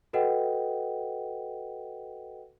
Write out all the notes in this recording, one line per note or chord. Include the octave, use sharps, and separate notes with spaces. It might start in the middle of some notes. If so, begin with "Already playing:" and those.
F#4 A4 B4 D#5 F#5 G5